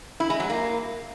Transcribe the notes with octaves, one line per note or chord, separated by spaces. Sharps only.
E4
G#3
F#3
A#3